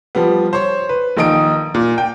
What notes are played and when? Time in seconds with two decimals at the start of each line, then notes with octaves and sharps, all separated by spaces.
0.15 F3 G3 B3
0.53 C5 C#5
0.89 B4
1.17 A#1 D#3 D#4 D#6 D7
1.74 A#2
1.98 G5